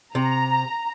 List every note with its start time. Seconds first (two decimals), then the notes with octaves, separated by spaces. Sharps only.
0.15 C3 A#5